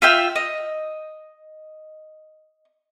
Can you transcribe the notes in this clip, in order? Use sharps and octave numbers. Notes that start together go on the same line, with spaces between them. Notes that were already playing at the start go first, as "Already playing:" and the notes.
F4 E5 G5 E6
D#5